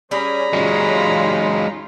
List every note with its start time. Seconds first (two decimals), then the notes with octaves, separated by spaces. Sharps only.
0.11 G3 C#4 G#4 A#5 B5
0.53 F#3 G#3 C#4 D#4 F4